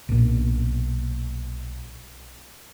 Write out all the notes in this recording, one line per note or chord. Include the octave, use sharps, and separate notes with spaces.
B1 A#2